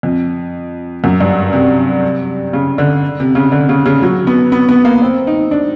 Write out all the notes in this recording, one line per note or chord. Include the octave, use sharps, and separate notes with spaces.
F2
F#2
G2
C3
C#3
D3
C3
C#3
D3
C#3
C#3
F#3
B3
B3
B3
A#3
C4
D#4
D4